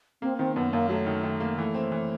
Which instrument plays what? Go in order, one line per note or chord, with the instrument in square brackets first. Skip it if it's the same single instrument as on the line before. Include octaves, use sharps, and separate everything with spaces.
[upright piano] A#3 [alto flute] C4
[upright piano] D#3 [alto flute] C4
[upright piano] F#2 [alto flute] B3
[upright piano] F#2 [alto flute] A#3
[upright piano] F#3 [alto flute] A3
[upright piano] D#3
D#3
A#3
[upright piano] E3 [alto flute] A3
[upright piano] C4
E3